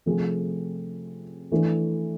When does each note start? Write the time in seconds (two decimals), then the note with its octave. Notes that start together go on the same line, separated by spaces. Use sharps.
0.06 C3 F3 A3 C4 G#4
1.52 E3 A3 D4